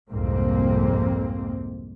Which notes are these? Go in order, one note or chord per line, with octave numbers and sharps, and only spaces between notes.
C2 F2 G#2 A#3 C4